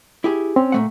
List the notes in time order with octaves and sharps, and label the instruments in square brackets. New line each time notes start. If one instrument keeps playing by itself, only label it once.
[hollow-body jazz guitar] E4 G4 G#4
[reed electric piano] C4 [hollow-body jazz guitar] C#4
[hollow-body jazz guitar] A#2 A3 F#5